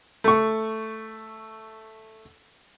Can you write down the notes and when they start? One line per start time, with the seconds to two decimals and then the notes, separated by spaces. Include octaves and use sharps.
0.24 A3 C#6